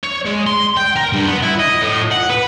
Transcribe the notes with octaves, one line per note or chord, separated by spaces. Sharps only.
C#5
G#3
C6
G5
A#4
G2
B3
E4
D#5
A2
F#5
B4